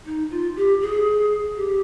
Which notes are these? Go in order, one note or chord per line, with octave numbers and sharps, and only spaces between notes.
D#4
F4
G4
G#4
G4